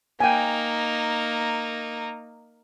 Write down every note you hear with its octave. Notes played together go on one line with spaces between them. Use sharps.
A#3 D#4 G5 G#5